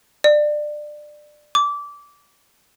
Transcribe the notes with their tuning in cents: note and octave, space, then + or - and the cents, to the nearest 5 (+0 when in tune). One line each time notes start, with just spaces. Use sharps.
D5 +20
D6 -20